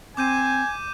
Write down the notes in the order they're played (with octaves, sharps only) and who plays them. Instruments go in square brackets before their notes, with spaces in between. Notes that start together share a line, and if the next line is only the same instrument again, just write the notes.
[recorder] C4 [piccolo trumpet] G#5 [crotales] D6 G6 D#7